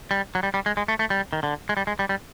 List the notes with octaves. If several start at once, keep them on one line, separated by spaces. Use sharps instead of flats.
G3
F#3
G3
G3
G#3
G#3
A3
A3
G3
D#3
D3
G#3
G3
G#3
G3
G3